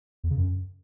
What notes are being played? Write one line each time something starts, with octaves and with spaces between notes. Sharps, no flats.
E2
C#3
F#2